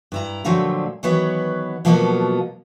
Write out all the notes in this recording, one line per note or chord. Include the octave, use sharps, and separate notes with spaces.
G2 E4 A#5
A#2 D3 F3 F#3 A3 C4
D#3 E3 F#3 B3 B4 C#5
B2 F3 F#3 A#3 B3 A4